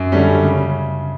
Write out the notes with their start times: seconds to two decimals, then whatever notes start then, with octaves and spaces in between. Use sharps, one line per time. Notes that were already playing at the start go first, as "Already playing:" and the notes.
Already playing: F#2
0.12 D3 G3 C#4
0.43 C#3